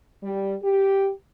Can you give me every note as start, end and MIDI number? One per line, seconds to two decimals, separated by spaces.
0.23 0.55 55
0.62 1.09 67